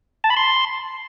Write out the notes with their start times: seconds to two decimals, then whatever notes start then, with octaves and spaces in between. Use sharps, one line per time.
0.24 A5
0.30 B5
0.37 C6